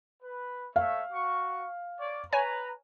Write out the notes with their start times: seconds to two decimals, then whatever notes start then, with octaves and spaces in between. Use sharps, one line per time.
0.23 B4
0.76 A3 C#5 E5 F5
1.12 F#4 C#6
1.99 C#5 D5
2.33 B4 C#5 G#5 A#5